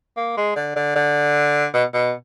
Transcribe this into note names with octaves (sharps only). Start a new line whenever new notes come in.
A#3
G#3
D3
D3
D3
B2
B2